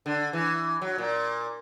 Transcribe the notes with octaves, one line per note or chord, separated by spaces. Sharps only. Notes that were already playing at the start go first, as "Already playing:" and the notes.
D3
E3
F#3
A#2